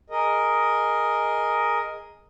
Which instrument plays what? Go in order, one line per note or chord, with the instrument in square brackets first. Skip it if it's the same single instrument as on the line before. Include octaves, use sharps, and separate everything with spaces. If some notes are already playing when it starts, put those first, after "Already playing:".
[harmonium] G#4 A#4 D#5